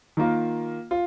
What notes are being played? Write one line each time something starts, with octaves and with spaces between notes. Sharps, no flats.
D#3 A#3 F4
F4